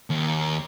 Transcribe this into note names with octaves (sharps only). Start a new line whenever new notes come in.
D#2